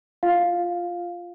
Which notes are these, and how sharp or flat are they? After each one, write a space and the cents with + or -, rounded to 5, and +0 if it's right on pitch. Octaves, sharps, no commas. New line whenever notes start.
F4 +0 F5 +5